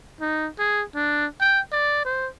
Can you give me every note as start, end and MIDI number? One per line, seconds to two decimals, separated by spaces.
0.21 0.49 63
0.59 0.83 68
0.95 1.26 62
1.41 1.60 79
1.72 2.05 74
2.05 2.28 72